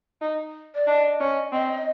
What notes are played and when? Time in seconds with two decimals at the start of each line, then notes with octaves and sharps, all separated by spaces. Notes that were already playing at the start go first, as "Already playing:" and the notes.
0.21 D#4
0.75 D5
0.87 D4 D#5
1.20 C#4
1.52 C4 D#5